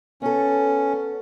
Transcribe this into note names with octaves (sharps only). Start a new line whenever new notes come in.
B3 C#4 A4